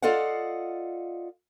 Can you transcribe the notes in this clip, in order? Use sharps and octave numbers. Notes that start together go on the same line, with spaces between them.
F4 A4 D5 D#5 F5 F#5